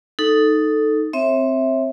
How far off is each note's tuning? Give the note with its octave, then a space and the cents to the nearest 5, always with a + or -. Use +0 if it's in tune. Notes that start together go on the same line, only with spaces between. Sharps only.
D#4 +0 A4 +0
C4 +0 C#5 -40 E5 -5